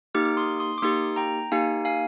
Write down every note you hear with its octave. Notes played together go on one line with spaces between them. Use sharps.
A#3 D#4 G4 D6 F6
D6
C6 D#6
C6 D#6
D6
A#3 D#4 G4 C6 D#6
G5 A#5
A#3 D#4 G4 F5 G#5
F5 G#5